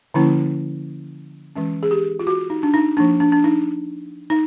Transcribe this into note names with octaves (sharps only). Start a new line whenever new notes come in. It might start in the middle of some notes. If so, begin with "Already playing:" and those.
D3 F3 A#3 C#4 E4
E3 G#3 C#4
G#4
G4
F4
F#4
D#4
D4
D#4
F3 A#3 D4
D4
D4
D#4
D#4